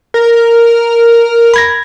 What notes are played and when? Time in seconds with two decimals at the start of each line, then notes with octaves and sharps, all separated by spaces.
0.14 A#4
1.54 B5 G#6 A#6